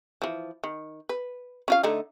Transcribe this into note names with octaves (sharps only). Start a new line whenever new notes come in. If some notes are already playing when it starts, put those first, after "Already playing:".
E3 F3
D#3
B4
C#4 F4 F5
D3 A3 D#4